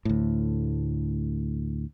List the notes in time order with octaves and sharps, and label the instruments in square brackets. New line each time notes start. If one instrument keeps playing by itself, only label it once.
[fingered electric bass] D2 A2